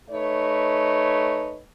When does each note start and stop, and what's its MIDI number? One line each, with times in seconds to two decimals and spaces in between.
0.11 1.59 57
0.11 1.59 63
0.11 1.59 71
0.11 1.59 73